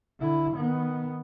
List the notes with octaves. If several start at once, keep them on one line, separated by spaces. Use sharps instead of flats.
D3 E4
D#3 B3